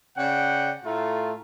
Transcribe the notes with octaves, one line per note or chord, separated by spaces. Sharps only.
C#3 D5 F#5 G5
A2 A3 F4 A#5